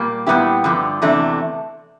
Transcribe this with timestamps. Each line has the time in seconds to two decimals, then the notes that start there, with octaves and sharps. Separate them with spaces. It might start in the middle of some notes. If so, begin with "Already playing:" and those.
Already playing: A#2 G3 A#3
0.26 A#2 G3 B3 E4 G4
0.64 G2 D3 F3
1.02 E2 C3 E3 A3 D4